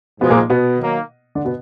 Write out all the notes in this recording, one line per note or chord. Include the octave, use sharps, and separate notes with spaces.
G#2 B2 F3 G#3 B3
A#2 A#3
B2 B3
D#3 F#3 A#3
D3 D4
B2 B3